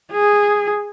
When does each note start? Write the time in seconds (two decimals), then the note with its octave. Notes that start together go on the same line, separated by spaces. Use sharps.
0.12 G#4